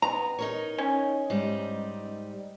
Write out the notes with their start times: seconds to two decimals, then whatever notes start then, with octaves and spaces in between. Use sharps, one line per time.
0.02 B3 A#5
0.39 D#4 A#4 C#5
0.78 C#4
1.30 G#2 G3 D#4